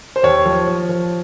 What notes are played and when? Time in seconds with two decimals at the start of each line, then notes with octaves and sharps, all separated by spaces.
0.16 C5
0.23 D#2 C#5
0.46 F3
0.67 F3
0.89 F3